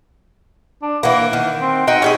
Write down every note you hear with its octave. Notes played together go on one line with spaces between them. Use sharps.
D4
E3 A#3 F#5
D#3
C4
D#4 F#4 D#5 G5
C#4 F#4 G#4